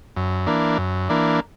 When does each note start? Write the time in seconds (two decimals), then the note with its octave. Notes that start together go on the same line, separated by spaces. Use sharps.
0.16 F#2
0.47 E3 A#3 D4
0.78 F#2
1.09 E3 A#3 D4